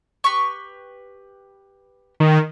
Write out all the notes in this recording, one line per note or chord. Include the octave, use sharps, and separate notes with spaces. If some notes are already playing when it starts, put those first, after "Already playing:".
G4 B4 C#6
D#3